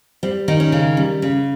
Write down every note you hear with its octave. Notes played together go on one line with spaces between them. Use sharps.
G3 C4
D#3 D#4
C#4
C#3
G3
C#3